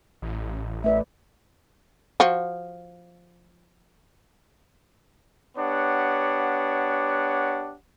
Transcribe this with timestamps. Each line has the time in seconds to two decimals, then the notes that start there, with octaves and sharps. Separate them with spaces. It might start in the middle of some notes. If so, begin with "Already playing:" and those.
0.22 A1
0.84 A3 B4 D5 E5
2.20 F3 F#4
5.57 B3 D4 G4 C#5 F#5